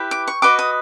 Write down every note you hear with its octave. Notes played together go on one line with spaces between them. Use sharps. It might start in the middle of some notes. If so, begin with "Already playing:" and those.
Already playing: E4 G4 B4
D6
C#6
F#4 B4 D#5 D6
D#6